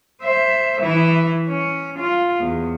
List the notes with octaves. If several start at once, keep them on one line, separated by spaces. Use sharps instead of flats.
C5 E5
E3 E4
C#4
F4
E2